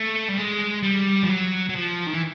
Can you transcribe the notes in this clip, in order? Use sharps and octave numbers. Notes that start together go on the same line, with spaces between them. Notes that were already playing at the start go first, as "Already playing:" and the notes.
Already playing: A3
G3
G#3
G3
F3
F#3
F#3
F3
D#3
E3